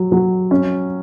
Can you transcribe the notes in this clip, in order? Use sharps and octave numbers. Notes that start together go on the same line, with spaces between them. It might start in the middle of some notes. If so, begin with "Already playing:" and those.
Already playing: F#3
F#3
C#4